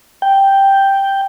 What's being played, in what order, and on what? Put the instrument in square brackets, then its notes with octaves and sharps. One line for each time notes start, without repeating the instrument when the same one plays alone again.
[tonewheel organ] G5